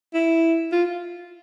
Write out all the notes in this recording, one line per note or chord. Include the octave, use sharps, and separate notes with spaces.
E4
F4